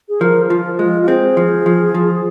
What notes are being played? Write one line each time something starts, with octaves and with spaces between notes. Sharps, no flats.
G#4
F3 A#4
F3 F4
G#3 F4
F4
C4 G#4
F3
F3
F3